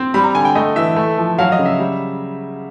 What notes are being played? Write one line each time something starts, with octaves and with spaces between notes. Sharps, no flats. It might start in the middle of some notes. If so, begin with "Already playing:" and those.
Already playing: C4
G3 B5
A#5
D3 G#5
G5
A3 D#5
E3 E5
A3
F3
F#3 F5
D#5
C#3
E5
G3